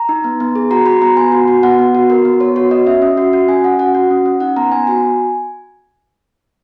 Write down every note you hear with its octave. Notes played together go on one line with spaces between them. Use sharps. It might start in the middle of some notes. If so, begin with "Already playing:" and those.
Already playing: A#5
D#4
B3
B3
G#4
F#4 A#5
F#4 B5
B3 A#5
B3 G#5
F#4
F#4
B3 F#5
B3
F#4
F#4 A#4
B3
B3 C#5
F#4 C#5
F#4 D#5
C#4 E5
C#4
F#4
F#4
C#4 G#5
C#4 F#5
F#4 F#5
F#4
C#4
C#4
D#4 F#5
B3 A#5
B3 G#5
F#4 G#5